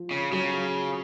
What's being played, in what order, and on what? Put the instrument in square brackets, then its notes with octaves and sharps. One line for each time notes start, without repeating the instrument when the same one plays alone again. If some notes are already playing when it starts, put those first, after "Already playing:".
Already playing: [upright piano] F3
[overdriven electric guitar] C#3
[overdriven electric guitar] C#3 [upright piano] F#3